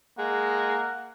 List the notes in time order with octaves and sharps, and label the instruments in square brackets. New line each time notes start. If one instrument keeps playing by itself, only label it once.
[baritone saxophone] G#3 [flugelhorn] A#3 [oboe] F#5